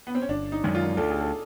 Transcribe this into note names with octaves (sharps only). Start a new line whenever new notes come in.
B3
C4
C#4
G1 D4
D#4
F#2 D#3 G#3
F4
D2 A4
G#4
A4